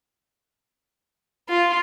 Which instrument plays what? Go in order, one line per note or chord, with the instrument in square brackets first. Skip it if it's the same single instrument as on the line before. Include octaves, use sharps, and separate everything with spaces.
[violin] F4